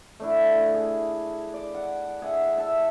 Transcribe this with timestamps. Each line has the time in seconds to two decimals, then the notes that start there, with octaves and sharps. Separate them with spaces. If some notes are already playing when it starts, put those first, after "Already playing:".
0.20 A3 D4 E4
0.74 G#4
1.54 D5
1.74 F#5
2.22 G#4 E5 F#5
2.58 E5 A5